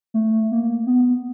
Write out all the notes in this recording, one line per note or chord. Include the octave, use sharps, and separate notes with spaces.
A3
A#3
B3